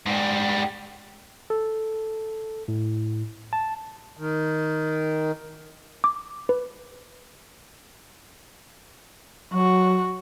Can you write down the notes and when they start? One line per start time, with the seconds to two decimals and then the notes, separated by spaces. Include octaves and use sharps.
0.06 G#2 G3
1.50 A4
2.68 A2
3.53 A5
4.17 D#3
6.04 D6
6.49 B4
9.54 F#3 F#4